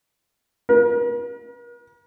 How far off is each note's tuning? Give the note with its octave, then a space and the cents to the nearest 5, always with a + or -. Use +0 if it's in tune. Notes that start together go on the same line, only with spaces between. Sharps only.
A#4 +45